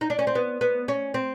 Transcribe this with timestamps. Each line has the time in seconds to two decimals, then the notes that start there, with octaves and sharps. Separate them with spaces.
0.01 D#4
0.10 D4
0.19 C#4
0.27 C4
0.35 B3
0.61 B3
0.88 C#4
1.14 C4